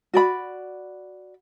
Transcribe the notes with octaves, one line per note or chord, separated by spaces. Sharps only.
F#4 D5 B5